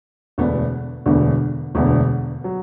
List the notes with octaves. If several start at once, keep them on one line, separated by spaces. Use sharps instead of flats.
E1 D2 D3 B3 D4
E1 D2 D3 B3 D4
E1 D2 D3 B3 D4
F#3